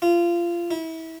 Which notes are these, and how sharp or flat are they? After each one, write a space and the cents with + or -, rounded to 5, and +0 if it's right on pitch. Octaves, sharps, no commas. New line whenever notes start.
F4 -25
E4 -30